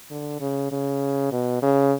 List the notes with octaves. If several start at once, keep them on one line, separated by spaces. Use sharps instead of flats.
D3
C#3
C#3
B2
C#3